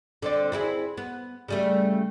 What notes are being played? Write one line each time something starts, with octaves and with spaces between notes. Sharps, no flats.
D3 C4 D5
C4 E4 G#4
B3
C#3 G3 A3